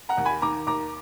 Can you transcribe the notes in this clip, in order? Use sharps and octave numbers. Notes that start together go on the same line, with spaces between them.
F#5 A#5
D#2
G#5 B5
D#3 A#5 D6
D#2 A#5 D6